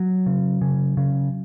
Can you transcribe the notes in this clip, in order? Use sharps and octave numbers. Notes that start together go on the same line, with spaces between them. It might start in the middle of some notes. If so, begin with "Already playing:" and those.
Already playing: F#3
C#3
C#3
C#3